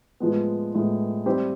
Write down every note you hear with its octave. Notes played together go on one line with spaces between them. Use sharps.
A2 F3 G#3 B3
A2 F3 G#3 B3
G3 C4 E4 G4 C5